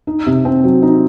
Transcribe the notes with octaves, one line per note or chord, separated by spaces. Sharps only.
D#4
C3
C4
F#3
D#4